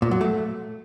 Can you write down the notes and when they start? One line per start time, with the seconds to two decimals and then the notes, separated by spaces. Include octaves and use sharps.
0.02 A#2
0.11 F#3
0.21 A3